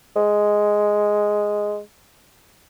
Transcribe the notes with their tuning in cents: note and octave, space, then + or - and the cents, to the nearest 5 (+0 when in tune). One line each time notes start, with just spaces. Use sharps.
G#3 +0